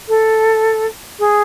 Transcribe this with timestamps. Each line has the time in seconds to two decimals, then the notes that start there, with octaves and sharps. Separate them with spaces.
0.09 A4
1.19 G#4